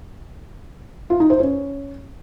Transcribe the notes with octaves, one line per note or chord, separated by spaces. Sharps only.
F4
D#4
C5
C#4